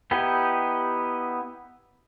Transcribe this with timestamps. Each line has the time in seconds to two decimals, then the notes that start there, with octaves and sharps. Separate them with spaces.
0.11 B3 D#4 E4 G4 G5